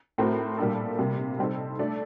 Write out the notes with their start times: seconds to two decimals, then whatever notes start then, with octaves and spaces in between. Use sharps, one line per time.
0.18 A2 A3 C4 F#4 A#4
0.58 A#2 G3 A#3 D4 A4
0.98 C3 G3 A#3
1.39 G3 C4 D#4 A4
1.79 A3 D4 A4 D5